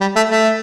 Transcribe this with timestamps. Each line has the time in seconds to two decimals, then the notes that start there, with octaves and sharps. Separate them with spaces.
0.01 G3
0.16 A3
0.31 A3